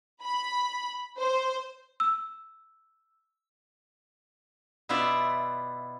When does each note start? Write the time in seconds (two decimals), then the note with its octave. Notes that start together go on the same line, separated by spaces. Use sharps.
0.23 B5
1.18 C5
2.00 E6
4.89 B2 B3 E4 F4 D5 E5